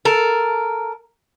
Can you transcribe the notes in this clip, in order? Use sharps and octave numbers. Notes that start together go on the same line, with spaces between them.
A4 A#4